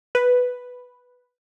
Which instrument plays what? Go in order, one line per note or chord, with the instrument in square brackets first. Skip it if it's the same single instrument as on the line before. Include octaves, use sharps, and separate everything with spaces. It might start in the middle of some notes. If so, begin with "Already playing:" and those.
[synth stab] B4